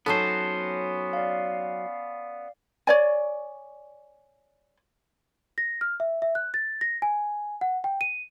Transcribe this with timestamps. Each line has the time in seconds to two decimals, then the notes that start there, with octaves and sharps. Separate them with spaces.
0.06 F#3 B3 C#4 D#4 A4 C5 C#5 A5
1.13 D5 F5
2.87 C#5 D5 G#5
5.58 A#6
5.81 F6
6.00 E5
6.22 E5
6.35 F#6
6.54 A6
6.81 A#6
7.02 G#5
7.61 F#5
7.84 G5
8.01 D#7